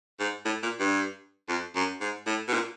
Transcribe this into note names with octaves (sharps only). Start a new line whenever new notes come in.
G#2
A2
A#2
G2
F2
F#2
G#2
A2
B2
A#2